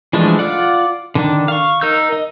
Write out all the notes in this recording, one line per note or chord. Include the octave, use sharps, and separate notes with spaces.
E3 F3 G#3 A3 D4
F4 D5 F#5
D3 D#3 D4
F5 C#6
D#4 A#4 E6 G6
D#5